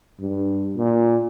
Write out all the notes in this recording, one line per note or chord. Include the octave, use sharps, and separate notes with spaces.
G2
A#2